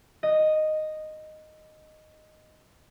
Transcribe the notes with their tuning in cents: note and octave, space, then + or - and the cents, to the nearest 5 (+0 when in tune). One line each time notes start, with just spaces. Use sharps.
D#5 -5